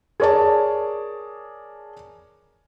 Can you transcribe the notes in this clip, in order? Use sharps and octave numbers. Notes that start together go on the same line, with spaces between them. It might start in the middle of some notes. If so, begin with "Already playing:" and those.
G#4 A#4 C#5 D5 A5